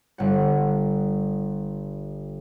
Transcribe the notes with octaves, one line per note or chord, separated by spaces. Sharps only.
G1 F#5